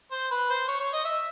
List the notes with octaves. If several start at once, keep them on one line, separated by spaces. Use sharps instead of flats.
C5
B4
C5
C#5
C#5
D#5
E5